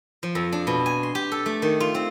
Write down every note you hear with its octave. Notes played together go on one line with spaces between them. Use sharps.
F3
F2
D4
B2
G#5
C6
G4
A4
A3
D#3
F4
C4